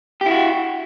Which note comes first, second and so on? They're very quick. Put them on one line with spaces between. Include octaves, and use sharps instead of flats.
G4 E4 F#4